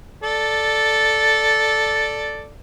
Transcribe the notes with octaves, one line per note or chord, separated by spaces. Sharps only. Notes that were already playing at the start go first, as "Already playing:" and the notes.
A4 D5